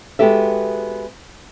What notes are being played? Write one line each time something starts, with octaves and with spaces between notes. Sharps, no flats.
G#3 B3 F#4 G4 A4 E5